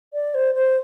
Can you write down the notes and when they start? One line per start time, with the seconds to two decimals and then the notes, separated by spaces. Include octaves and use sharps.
0.13 D5
0.35 C5
0.55 C5